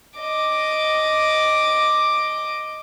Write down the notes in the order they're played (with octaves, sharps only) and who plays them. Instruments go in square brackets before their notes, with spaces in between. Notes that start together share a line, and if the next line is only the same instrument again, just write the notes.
[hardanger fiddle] D#5 D6